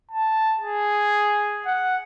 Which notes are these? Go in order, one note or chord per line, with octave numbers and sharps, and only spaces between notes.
A5
G#4
F#5